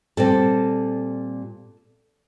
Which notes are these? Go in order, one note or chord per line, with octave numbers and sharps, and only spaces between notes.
A#2 G3 C4 A4